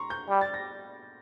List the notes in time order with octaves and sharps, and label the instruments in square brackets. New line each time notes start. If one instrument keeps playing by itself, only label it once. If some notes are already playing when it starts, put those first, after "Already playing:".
Already playing: [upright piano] A#5 C6 C#6
G6
[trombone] G3
[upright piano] A6
A#6